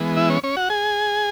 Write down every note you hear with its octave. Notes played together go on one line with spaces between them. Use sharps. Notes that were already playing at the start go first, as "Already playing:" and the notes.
Already playing: E3 G#3 B3
E4 E5
C#4 C#5
C#4 C#5
F#4 F#5
G#4 G#5